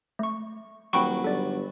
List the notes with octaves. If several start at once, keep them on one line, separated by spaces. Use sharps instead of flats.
A3 C#6
D#1 F#3 G5 B5 C#6
G1 A4 D5